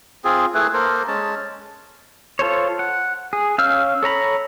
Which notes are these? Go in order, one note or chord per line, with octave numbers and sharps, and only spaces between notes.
C4 F4 G#4
A3 E4 G#4 B4
A#3 A4 A#4 C5
G#3 C#4 A5
F4 A4 C5 C#5
F#5
G#4
C#4 F5 E6 F6 G6
A4 C#5 A#5 B5